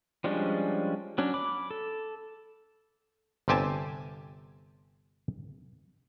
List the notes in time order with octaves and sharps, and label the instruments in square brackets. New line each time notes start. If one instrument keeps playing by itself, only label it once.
[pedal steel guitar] F3 G3 G#3 C#4 D4
F#3 C#4 D4
B5 D6
A4
[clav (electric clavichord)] G1 C3 C4 G4 G#5 A5